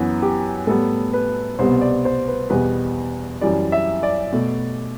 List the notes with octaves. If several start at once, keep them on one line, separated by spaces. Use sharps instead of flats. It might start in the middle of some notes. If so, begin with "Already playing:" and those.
Already playing: F#2 E3 B3 F#4
G4
A2 G3 B3 A4
B4
C2 B2 G3 B3 C5
D5
C5
B4
E2 B2 G3 B3 B4
F#2 E3 G3 D5
E5
D5
B2 A3